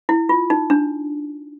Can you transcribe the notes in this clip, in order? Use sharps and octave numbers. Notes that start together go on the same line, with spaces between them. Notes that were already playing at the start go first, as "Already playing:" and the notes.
E4
F4
D#4
D4